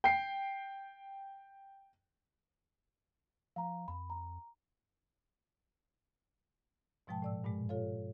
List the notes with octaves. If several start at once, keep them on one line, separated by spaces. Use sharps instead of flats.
G5 C7
F3 F5 A#5
F2 B5
A#5
G#2 B2 F3 G#3 G5 A5
A2 D5 E6
G2 A#2 G#3
F4 A4 C#5 F5